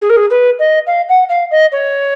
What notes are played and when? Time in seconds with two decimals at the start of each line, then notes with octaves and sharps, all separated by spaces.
0.02 G#4
0.10 A#4
0.16 G#4
0.30 B4
0.59 D#5
0.87 F5
1.09 F#5
1.29 F5
1.51 D#5
1.72 C#5